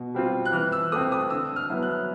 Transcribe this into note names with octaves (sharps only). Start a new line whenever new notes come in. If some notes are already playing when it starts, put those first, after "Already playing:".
Already playing: B2
G3 C4 F4
F#6
E3 F6
E6
A3 C4 D#6
D#6
D3 E6
F6
F#3 B3 E4
F#6